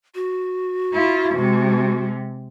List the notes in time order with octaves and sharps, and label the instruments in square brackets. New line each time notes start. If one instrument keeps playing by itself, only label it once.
[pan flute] F#4
[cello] E4 F4
C3 G#3